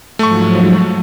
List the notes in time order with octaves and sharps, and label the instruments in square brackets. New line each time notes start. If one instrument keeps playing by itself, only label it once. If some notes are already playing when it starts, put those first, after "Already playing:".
[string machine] G#2 F3 F#3 [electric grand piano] A3 C#6